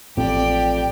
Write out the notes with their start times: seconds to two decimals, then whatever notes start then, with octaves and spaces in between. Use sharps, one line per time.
0.17 A1 F2 C4 G4 D5 G5